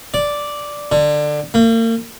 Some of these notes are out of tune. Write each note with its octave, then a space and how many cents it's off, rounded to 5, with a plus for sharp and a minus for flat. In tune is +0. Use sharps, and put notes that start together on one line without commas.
D5 -5
D3 +20
A#3 -40